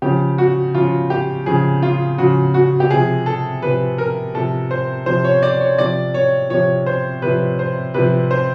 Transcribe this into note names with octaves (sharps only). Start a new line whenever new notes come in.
C#3 F3 G4
F#4
C#3 F3 F4
G4
C#3 F3 G#4
F4
C#3 F3 F#4
F#4
G4
C3 F3 G#4
A4
C3 F3 B4
A#4
C3 F3 A4
C5
C3 F3 C5
C#5
D5
C#5
C3 F3 D5
C#5
C3 F3 C#5
C5
C3 F3 B4
C5
C3 F3 B4
C5